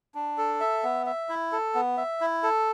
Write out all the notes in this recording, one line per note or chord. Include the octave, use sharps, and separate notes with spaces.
D4
A4
E5
B3
E5
E4
A4
B3
E5
E4
A4